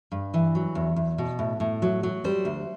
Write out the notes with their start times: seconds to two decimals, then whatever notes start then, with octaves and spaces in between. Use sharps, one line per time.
0.12 G2
0.34 E3
0.55 F#3
0.75 E2
0.96 E2
1.18 B2
1.39 A2
1.60 A2
1.82 F#3
2.03 F#3
2.24 G3 C5
2.45 D2